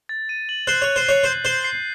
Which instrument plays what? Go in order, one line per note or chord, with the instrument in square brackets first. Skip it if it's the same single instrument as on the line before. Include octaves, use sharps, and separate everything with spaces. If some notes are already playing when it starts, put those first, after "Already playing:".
[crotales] A6
D#7
F#7
[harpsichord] C5 [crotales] F#6
[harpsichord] C#5 [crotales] F#6
[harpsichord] C5
[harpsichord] C#5 [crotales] C7
[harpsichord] C5
[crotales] G6
[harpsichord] C5 [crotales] G6
[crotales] C7